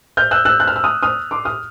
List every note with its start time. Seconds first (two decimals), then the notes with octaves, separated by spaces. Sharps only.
0.17 F6 G6
0.31 E6 F#6
0.45 E6 F#6
0.60 F#6
0.67 F6
0.76 E6
0.84 D#6 F6
1.03 D#6 F6
1.31 C6 D6
1.45 D#6 F6